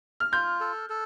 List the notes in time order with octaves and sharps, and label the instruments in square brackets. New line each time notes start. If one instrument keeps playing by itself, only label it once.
[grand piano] F6
[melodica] F4 [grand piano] G6
[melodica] A4
A4